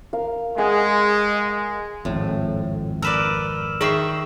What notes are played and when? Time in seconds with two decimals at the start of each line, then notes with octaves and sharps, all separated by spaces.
0.13 A#4 F5
0.58 G#3 G#4 F#5
2.05 G#1 F2 A2
3.02 A#4 B4 D5 E6 F6 E7
3.81 D#3 D#4 G#4 E5 C#6 C7